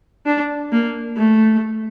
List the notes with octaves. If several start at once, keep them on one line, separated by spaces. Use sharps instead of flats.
D4
A#3
A3